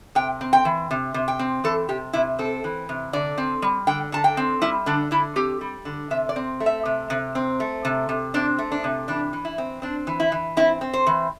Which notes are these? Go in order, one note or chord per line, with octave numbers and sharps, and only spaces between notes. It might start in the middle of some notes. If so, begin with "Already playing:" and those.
C3 G5
C4
G5
E3
C3
C3
G5
C4
E3 A4
C3 G4
C3 E4
C4 A4
E3
C3
D3 D5
C4
G3
D3 G5
D3 A5
G5
C4
G3 E4
D3 D4
D3 E4
C4 G4
G3
D3
C3 E5
D5
C4
A3
E5
C3
C3
C4
A3
C3
C3
C4 D4
A3
D4
C3
E3 D4
E3
E4
C4
C4 D4
E3
E4
E3
C4 E4
C4
C5
E3